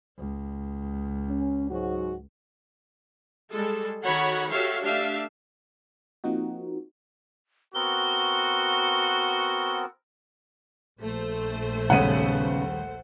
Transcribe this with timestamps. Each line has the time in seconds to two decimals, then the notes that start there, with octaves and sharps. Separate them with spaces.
0.18 C#2
1.29 C#4
1.70 G#2 F#3 F#4
3.52 G3 G#3 A4
4.04 D#3 F#4 A4 C#5 F#5 B5
4.50 F#4 G4 A4 C#5 E5 F5
4.84 A3 D4 G4 E5 F5
6.24 F3 A#3 C4 D#4 F#4
7.75 B3 C4 F#4 A#4 G7
11.01 A#1 A3 C5
11.90 D#2 C#3 G3 G#3 B3 F#5 D#7